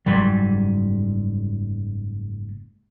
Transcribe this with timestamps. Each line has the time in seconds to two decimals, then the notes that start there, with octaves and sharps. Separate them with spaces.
0.06 F#1 G#2 F#3 G3